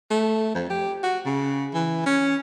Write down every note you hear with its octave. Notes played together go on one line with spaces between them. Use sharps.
A3
F2
G4
F#4
C#3
E3
C#4